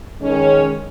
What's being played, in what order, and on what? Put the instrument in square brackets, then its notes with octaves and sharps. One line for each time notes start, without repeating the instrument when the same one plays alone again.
[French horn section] D#3 G#3 C#4